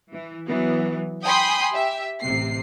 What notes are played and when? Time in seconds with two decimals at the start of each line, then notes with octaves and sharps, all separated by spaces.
0.11 E3
0.47 E3 F#3 B3
1.24 G5 G#5 B5 C6 D#6 G6
1.74 G4 E5
2.21 A1 C3 C7